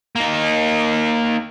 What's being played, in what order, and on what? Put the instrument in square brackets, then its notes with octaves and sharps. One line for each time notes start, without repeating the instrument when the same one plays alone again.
[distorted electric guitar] A#3 D#4